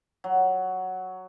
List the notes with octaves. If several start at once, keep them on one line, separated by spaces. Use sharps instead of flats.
F#3